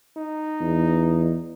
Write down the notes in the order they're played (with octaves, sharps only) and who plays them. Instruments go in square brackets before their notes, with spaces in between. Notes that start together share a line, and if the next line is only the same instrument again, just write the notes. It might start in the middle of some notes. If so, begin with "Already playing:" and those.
[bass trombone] D#4
[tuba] E2